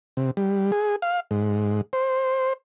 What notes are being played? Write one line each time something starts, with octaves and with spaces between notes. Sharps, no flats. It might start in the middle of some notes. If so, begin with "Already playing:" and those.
C3
G3
G#4
F5
G#2
C5